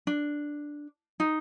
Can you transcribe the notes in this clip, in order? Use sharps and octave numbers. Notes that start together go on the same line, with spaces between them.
D4
D#4